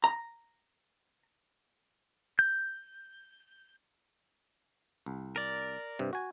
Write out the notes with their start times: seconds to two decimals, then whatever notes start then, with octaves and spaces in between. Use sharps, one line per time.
0.04 A#5
2.39 G6
5.06 C2
5.36 A#4 D5
5.99 G2 C3
6.13 F#4 G#5